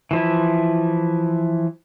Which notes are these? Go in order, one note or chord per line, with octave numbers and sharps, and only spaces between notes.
E3 F3 E4